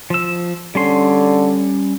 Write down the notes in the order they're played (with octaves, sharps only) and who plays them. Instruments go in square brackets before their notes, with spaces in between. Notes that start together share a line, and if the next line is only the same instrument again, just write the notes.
[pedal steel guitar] F3 E6
[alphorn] D3 [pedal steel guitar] G3 C#4 C6